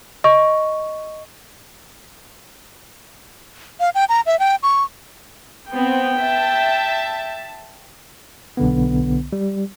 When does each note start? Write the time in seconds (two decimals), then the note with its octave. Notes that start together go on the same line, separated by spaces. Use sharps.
0.24 D#5 C#6
3.80 F5
3.95 G5
4.09 A#5
4.26 E5
4.40 G5
4.63 C#6
5.71 B3 C4 G5
6.18 E5 A5
8.57 B1 D3 B3
9.33 G3